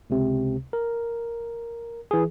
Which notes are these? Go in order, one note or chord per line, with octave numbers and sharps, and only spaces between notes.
C#2 C3
A#4
E3 G#4